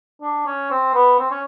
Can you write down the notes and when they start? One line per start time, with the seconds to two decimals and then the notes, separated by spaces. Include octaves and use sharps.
0.22 D4
0.46 C#4
0.71 C4
0.95 B3
1.19 C4
1.31 C#4